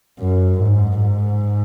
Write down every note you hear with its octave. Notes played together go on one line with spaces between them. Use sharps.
F#2
G#2
G#2